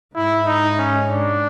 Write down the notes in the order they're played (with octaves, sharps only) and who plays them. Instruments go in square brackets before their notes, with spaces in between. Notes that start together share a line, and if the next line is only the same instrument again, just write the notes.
[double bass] G#2 [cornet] E4
[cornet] D#4
C#4
D4